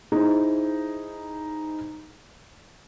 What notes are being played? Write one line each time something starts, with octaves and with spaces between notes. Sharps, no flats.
D#4 E4 G#4 C5